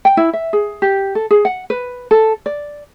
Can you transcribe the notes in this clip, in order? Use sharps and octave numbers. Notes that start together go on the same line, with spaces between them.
G5
E4
E5
G#4
G4
A4
G#4
F#5
B4
A4
D5